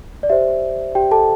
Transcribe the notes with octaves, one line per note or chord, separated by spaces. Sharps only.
D5
G4 C5 E5
G4 G5
A4 A5